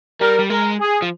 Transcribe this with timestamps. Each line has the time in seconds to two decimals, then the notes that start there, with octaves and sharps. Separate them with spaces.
0.21 G3 A#4
0.39 G3
0.50 G#3 A#4
0.79 G#4
1.02 F3